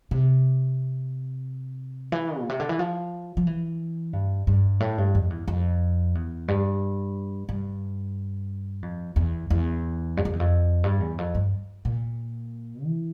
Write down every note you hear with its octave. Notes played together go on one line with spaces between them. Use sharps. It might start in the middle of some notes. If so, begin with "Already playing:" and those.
C3
E3
A#2
C3
D3
E3
F3
F3
E3
G2
G2
A2
G2
F2
E2
F2
E2
G2
G2
F2
E2
E2
G2
F2
E2
F2
G2
E2
F2
G2
A#2
E3